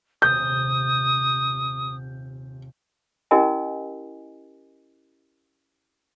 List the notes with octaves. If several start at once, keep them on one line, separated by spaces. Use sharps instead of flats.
D#1 C3 D#6 G6
C#4 E4 G4 A#4 D#5 G#5